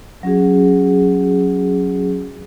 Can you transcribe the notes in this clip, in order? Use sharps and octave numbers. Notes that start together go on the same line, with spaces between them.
F#3 C#4 F#4 G#4